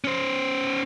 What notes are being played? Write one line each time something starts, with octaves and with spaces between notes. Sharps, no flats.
C#4 C5